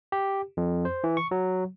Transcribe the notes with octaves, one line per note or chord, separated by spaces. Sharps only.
G4
F2
C5
E3
C#6
F#3